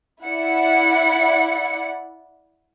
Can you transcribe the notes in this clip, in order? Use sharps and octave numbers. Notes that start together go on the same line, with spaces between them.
E4 D5 F#5 C#7